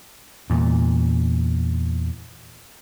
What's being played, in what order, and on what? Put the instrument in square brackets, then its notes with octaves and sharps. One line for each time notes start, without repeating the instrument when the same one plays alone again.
[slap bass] E2 A#2